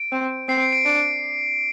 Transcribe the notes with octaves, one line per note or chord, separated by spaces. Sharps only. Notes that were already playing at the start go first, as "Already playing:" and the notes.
Already playing: D7
C4
C4 C7
D7
D7
D4 D7